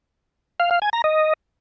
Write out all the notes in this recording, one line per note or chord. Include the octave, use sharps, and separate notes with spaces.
F5
F5
G#5
A#5
D#5